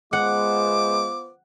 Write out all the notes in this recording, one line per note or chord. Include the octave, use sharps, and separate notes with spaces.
G#3 B3 F4 C5 F#5 D6